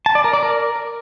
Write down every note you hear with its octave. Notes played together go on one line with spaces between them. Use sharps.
A5
D5
A#4
D5
A#4